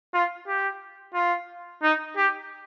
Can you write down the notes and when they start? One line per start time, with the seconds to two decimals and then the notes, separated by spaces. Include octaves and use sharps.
0.14 F4
0.47 G4
1.14 F4
1.83 D#4
2.17 G4